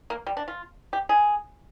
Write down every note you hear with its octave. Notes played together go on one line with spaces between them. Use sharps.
A#3
G3
D4
F4
G4
G#4